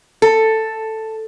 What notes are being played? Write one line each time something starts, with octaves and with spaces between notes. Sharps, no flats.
A4